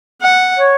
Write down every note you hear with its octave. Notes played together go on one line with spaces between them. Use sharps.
F#5
C#5